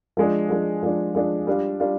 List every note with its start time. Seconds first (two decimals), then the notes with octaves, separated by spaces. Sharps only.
0.17 F3 G#3 D4
0.49 F3 G#3 D4
0.83 F3 G#3 D4
1.15 F3 G#3 D4
1.47 G3 D4 F4
1.80 G3 D4 F4